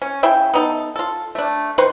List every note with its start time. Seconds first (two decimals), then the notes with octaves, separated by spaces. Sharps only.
0.02 C#4
0.23 C#3 E4 E5 G5
0.54 B3 D#4 A4
0.96 F4 A4
1.35 A3 D4
1.78 D#3 B4 C5 C#6